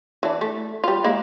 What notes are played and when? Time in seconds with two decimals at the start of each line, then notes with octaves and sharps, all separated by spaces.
0.23 E3 D4
0.41 A3
0.84 G3 F4
1.04 G#3 A#3 E4